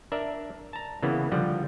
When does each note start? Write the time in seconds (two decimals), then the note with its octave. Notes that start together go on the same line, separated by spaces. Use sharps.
0.12 D4 A#4 D5 E5
0.73 A5 A#5
1.03 C#3 E3 A#3 B3
1.32 D3 F3 G3 F#5